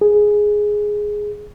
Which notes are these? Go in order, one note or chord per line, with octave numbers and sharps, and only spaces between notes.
G#4